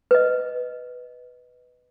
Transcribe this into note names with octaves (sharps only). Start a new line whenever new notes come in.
B4 D#5